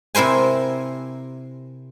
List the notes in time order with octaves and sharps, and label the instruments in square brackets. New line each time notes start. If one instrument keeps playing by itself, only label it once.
[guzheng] C3 E4 A#4 C5 G#5